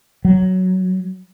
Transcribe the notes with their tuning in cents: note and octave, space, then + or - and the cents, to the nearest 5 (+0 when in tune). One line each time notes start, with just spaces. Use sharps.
F#3 +5